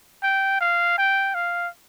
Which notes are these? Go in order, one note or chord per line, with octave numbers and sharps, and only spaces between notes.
G5
F5
G5
F5